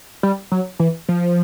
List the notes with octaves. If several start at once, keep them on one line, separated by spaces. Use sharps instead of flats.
G3
F#3
E3
F3